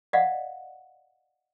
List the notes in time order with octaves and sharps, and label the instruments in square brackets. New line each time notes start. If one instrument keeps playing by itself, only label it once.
[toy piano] D5 D#5 F5 F#5